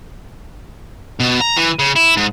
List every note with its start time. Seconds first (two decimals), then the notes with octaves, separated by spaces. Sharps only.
1.20 B2
1.40 A#5
1.56 E3
1.79 C#3
1.96 E4
2.17 G#2